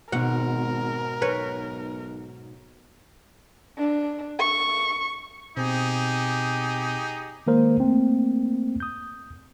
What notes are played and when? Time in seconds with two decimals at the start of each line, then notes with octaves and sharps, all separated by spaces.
0.12 G#1 G#2 B2 A#4 F#5
1.22 B1 B4 C#5
3.78 D4
4.39 C#6
5.57 B2 C4 D#4 G4 G#4
7.47 D#3 G#3 A#3 A#4 C5
7.80 A3 A#3 C4
8.80 D#6 G6